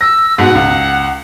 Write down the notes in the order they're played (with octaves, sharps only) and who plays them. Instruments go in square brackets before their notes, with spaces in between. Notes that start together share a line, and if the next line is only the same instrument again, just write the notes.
[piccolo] E6 [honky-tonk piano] A#6
[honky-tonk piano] G#2 B2 [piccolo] F#5
[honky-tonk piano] C#2